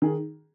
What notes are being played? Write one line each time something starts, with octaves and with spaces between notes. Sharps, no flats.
D#3 G#4